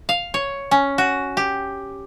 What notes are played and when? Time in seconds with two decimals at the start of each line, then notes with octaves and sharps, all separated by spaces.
0.09 F5
0.34 C#5
0.71 C#4
0.98 F#4
1.37 G4